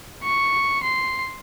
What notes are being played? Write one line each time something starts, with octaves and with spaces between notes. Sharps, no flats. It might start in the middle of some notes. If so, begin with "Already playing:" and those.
C#6
C6